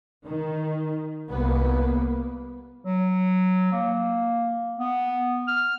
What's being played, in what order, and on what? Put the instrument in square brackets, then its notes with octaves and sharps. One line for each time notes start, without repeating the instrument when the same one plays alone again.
[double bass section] D#3
C2 A#3 B3
[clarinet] F#3
A#3
B3
F6